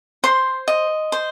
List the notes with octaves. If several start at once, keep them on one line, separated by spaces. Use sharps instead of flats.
C5 C6
D#5
C5